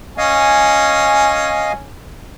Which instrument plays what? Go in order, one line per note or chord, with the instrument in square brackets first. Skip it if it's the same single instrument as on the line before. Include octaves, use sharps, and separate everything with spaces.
[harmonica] C#4 [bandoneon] D#5 F5 G#5